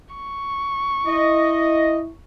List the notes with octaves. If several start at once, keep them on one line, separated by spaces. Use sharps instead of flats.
C#6
E4 D#5